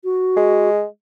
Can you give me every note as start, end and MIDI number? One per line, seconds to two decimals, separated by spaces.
0.04 0.69 66
0.36 0.85 56